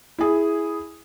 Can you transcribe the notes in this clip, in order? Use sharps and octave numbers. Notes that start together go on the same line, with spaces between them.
E4 G#4